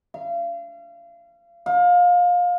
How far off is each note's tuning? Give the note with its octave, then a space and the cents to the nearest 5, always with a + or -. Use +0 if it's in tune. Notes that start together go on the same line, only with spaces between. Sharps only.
F5 -35
F5 +25